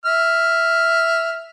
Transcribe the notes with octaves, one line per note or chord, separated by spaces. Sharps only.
E5 F6